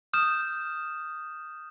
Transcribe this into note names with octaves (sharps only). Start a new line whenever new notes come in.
D#6 F6 G6 E7